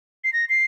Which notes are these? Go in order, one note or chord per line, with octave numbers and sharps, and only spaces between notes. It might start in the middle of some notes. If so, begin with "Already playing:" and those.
C7
A#6
C7